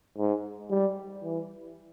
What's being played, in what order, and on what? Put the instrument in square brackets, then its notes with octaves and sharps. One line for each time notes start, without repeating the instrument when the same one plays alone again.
[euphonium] G#2
G3
E3